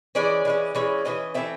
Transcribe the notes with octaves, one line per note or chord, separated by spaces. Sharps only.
E3 G#3 C#4 D5
E3 G#3 C#4
E3 G#3 C#4
E3 G#3 C#4 D#5
E3 A3 C4 E5